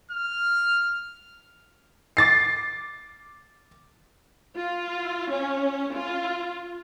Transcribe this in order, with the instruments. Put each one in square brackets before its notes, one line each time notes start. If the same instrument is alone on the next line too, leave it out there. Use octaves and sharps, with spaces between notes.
[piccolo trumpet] F6
[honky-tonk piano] D6 A6 C7
[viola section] F4
C#4
F4